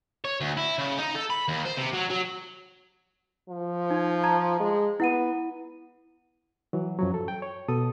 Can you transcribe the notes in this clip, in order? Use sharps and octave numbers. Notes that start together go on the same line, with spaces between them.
C#5
D2
E4
C#3
D#4
A4
B5
D#2
C5
C3
F#3
F#3
F3
D#4 G#6
A5 A#5 G#6
G#3
B3 E4 F#5 D#7
E3 F#3
F#2 F3 F#3
A4
G5
C#5
B2 A4 D#6